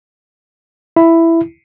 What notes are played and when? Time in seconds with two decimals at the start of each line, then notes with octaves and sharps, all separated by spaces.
0.96 E4